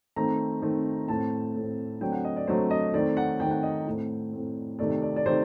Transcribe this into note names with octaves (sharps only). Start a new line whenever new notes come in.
D#3 A3 C4 A#5
D#3 A3 C4
A2 A3 C4 A5
A2 A3 C4
D3 F#3 A3 C4 G5
F#5
D#5
D5
D3 F#3 A3 C4 C5
D#5
D#3 A3 C4 D5
F#5
D#3 A3 C4 G5
F#5
D#5
A2 A3 C4
A2 A3 C4
C3 D#3 A3 D5
D5
D5
C3 D#3 A3 C5